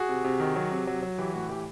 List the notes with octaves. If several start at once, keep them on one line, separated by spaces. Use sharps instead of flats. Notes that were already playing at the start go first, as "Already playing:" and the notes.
Already playing: F#4 G#4
C3
C3
D#3
F#3
C3
F#3
F#3
E3 G4
A2 F#4
E3 G4